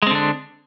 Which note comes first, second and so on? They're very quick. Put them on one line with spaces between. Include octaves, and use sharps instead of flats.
G#3 C4 D3 D4